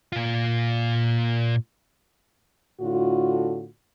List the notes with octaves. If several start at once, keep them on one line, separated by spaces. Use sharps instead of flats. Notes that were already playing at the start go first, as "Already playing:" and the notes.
A#2 F4
A2 D3 F4 F#4